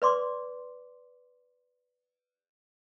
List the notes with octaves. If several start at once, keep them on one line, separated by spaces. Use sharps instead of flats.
B4 D5 C6 D6